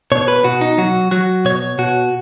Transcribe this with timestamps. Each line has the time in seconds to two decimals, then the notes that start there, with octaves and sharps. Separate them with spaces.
0.12 B2 C#5
0.28 B4
0.44 B2 F#4
0.61 D#4
0.78 F#3 F#4
1.11 F#3 F#4
1.45 B2 C#5
1.79 B2 F#4